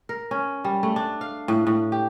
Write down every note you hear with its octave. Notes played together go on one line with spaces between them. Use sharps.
A#4
C#4
G3
A3
D4
F5
A2
A2
G4